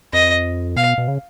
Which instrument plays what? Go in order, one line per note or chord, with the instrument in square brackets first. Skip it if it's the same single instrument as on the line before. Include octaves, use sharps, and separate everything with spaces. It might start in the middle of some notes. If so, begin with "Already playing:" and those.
[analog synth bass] F2 [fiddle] D#5
[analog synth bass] B2 [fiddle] F5
[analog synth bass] B2
C#3